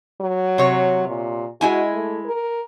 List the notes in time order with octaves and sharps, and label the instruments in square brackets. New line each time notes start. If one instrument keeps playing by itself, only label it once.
[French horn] F#3
[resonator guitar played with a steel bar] C3 C#5
[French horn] A#2
[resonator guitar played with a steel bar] G#3 E4 G#5 [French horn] F#4
[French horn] A3
A#4